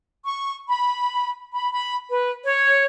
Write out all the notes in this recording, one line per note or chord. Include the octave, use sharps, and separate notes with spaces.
C#6
B5
B5
B5
B4
C#5